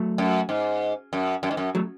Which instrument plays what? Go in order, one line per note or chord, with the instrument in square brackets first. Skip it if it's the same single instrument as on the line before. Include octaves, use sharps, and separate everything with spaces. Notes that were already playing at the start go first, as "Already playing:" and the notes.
Already playing: [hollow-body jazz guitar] F#3 A3
[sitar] F#2
G#2
F#2
F#2
G#2
F#2
[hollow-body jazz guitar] F#3 A3